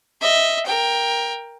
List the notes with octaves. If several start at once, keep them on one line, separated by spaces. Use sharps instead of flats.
D#5 E5
A#4 G5